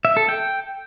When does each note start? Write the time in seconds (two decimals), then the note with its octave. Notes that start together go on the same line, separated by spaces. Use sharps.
0.05 E5
0.17 A4
0.29 G5